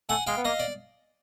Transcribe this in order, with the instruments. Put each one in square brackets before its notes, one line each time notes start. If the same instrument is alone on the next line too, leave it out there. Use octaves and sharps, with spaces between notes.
[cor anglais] A3 [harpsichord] F#5 G#5
[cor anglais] G#3 [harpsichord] F5 G5
[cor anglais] B3
[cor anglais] A#3 [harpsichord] D#5 F5
[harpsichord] D5